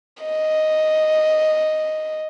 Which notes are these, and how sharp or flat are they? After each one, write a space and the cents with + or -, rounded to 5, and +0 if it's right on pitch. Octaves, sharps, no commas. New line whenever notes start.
D#5 +0